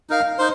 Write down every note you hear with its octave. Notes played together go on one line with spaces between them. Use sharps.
D#4 A#4 F5
D#4 C5